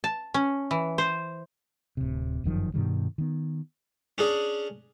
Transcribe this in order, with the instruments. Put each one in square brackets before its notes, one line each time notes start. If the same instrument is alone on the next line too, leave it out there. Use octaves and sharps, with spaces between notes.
[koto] A5
C#4
E3
C5
[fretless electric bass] D1 C3
G1 F#2 D#3 F3
G2 B2 D#3 G3
D#3 B3
[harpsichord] C#4 D4 G#4